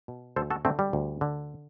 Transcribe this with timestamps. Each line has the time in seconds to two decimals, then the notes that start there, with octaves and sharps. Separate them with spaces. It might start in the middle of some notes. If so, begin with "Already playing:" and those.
0.08 B2
0.36 D2 A4 C5
0.50 F#4 A4
0.65 D3 A3 C4
0.79 G3
0.93 D2
1.21 D3